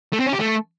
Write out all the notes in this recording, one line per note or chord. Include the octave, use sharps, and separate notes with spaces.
A3
C4
C#4
G4
A3